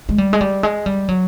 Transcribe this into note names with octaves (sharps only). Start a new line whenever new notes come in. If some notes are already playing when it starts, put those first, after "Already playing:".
G#3
G3
G#3
G3
G#3
G3
F#3